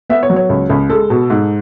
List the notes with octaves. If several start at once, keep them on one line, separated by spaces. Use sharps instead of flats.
B3 E5
C#5
F#3
C#5
C#2
C#2
G#3 A4
B2
G#2